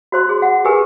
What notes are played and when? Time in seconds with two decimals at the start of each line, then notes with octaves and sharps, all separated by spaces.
0.12 F#4 C5 C6
0.29 G#4
0.42 F#5
0.65 G4 G#4 A#4 B4 G#5